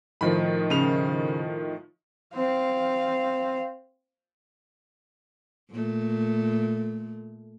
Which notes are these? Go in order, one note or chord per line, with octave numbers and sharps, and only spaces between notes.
A2 D#3 F3 B5
C#3 F7
C4 F5
A#2 A3